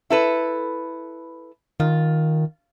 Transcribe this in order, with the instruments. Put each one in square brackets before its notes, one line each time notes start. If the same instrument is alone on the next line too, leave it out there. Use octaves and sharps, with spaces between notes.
[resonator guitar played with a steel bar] E4 A4 B4
[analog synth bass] D#3 [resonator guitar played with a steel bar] F4